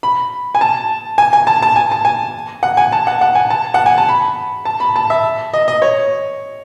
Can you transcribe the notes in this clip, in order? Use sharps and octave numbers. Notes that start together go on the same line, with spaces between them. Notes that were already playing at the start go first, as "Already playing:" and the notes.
B5
G#5
A5
G#5
G#5
A5
A5
G#5
A5
G#5
F#5
G#5
A5
F#5
F#5
G#5
A5
F#5
G#5
A5
B5
A5
B5
A5
E5
D#5
D#5
C#5